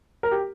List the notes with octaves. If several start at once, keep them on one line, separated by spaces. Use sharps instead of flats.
A#4
G4